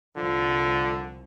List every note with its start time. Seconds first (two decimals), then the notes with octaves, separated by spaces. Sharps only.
0.16 C2 D3 F3